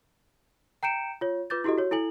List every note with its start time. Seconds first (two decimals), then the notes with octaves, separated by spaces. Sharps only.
0.83 G5 A#5 G6 C#7 D7 E7
1.21 F4 C#5
1.50 F4 B4 D6 G6 A6
1.64 E4 F#4 G4 A4 D#5
1.78 F#4 C#5
1.91 E4 A4 G#5 F#7